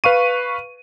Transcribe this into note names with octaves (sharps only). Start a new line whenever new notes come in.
B4 F5 C#6 D#7